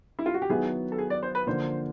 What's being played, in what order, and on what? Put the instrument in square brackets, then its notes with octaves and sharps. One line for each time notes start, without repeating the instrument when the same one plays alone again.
[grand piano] E4
F4
F#4
G4
[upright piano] D#3 F#3 B3 E4 [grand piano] G#4
[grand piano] A4
G#4
D5
C5
B4
[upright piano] D3 F3 A#3 [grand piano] C5